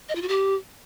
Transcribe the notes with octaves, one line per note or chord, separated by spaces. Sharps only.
D#5
F4
F#4
G4